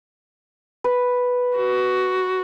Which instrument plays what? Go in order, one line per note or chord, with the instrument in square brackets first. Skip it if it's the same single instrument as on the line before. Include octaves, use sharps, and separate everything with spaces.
[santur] B4
[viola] F#4